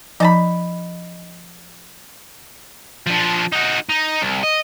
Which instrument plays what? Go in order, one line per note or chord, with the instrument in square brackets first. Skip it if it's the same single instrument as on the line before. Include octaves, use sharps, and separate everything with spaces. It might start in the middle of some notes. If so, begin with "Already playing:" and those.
[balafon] F3 [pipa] D#4 A5 B5
[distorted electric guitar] F3 D4
D#4 F#4
D#4
C2
D#5